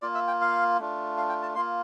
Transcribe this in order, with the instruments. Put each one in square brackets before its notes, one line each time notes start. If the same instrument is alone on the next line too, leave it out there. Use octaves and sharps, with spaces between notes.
[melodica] A#3 F4 D5
E5
G5
F5
A3 D4 F4
F5
G5
A5
A#3 F4 C6